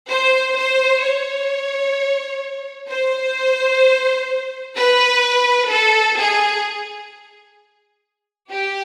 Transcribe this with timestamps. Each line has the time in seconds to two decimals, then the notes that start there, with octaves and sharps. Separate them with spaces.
0.11 C5
0.57 C5
1.04 C#5
2.91 C5
4.77 B4
5.71 A4
6.18 G#4
8.51 G4